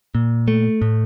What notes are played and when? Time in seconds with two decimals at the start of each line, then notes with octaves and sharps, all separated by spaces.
0.15 A#2
0.48 A3
0.82 A2